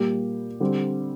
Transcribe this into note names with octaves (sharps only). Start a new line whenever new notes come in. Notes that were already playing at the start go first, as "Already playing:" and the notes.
Already playing: A#2 G3 A#3 G4
D3 G3 C4